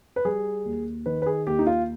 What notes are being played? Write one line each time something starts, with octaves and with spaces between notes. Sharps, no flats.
B4
G3 G#4
D#2
D#3 B4
B4
G#4
D#2 G4
D#4
F4